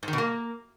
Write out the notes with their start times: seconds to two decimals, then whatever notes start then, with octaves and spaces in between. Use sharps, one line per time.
0.03 G#2
0.08 D#3
0.13 B2
0.18 A#3